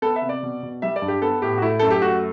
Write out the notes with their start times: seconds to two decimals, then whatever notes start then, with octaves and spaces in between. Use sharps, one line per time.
0.02 B3 A4
0.16 E5
0.22 C3
0.29 D5
0.43 B2
0.63 B2
0.82 G3 E5
0.96 D5
1.02 G2
1.08 G4
1.22 B3 A4
1.42 A2 G4
1.58 F#4
1.62 A3 E4
1.79 F#2 A4
1.90 G4
2.01 A3 F#4